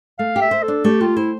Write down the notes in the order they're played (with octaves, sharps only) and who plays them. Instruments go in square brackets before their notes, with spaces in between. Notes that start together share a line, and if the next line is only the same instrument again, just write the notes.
[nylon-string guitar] A3 [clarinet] F5
[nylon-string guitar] G4
[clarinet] E5
[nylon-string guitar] C5
[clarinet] A4
[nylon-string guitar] D4
[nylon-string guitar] A3 [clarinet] G4
[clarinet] F4 [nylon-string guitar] G4
[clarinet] E4 [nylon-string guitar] C5